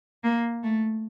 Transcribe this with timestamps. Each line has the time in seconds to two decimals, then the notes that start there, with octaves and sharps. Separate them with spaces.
0.24 A#3
0.64 A3